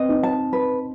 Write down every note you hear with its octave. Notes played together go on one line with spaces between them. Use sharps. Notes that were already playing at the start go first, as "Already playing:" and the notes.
Already playing: C4 B4 D#5
D#4
A5
B4